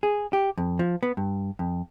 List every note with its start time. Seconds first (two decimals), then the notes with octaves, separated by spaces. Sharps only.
0.03 G#4
0.33 G4
0.57 F2
0.79 F3
1.03 B3
1.17 G2
1.59 F2